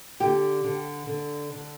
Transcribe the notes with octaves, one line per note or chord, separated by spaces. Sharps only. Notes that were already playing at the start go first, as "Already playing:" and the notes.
D3 G4
D3
D3
D3